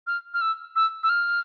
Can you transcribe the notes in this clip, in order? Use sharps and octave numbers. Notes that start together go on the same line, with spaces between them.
F6
F6
E6
E6
E6
F6